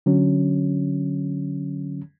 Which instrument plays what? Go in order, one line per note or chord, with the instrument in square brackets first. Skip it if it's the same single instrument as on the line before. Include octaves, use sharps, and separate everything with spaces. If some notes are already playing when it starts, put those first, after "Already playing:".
[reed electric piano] D3 F#3 C#4